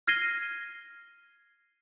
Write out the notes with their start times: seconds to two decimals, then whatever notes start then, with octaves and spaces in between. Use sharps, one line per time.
0.07 F6 G#6 A#6 C7 D#7 G7